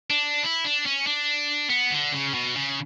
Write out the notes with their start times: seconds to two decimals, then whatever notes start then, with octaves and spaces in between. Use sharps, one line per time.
0.10 D4
0.43 E4
0.64 D4
0.86 C#4
1.07 D4
1.70 B3
1.91 D3
2.12 C#3
2.34 B2
2.56 C#3